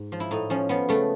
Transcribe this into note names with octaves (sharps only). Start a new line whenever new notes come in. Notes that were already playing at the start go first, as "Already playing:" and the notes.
Already playing: G#2
F3
E4
A2 D#4
F3 C#4
F3 B3
C#3 A3